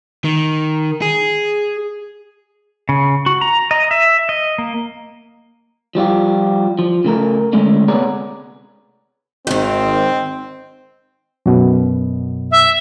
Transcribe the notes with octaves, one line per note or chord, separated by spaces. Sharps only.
D#3
G#4
C#3
F#4
A#5
D#5
E5
D#5
A#3
F3 G3 F4 G4
F3
C#3 A3 A#4
D3 G#3 A3 C#4 D4
C3 B3 G#4 C#5 D5 A#5
G#1 G#2 D#3 C4
F#2 B2
E5